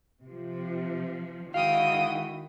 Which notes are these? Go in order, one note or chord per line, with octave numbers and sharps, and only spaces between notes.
C3 F3
D#3 G#3 E4 F#4 F5 G5 D#6